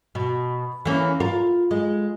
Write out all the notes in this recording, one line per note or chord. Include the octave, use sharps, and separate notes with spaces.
B2
E3 A#3 C#4
F4 A#4
G#3